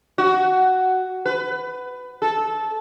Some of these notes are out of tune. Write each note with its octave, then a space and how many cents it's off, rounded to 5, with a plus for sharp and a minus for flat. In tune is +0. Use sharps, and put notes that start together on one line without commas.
F#4 +10
B4 +20
A4 -15